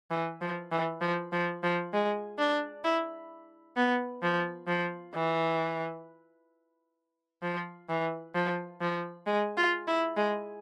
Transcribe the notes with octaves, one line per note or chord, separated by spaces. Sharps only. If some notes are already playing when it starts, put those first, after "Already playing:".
E3
F3
E3
F3
F3
F3
G#3
D4
E4
B3
F3
F3
E3
F3
E3
F3
F3
G#3
F4
E4
G#3